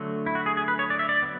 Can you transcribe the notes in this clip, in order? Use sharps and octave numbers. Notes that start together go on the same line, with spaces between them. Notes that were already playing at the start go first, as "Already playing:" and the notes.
Already playing: D3 F#3 A3
E4
F#4
G#4
G#4
B4
C#5
D5
E5
D5
F#3 B3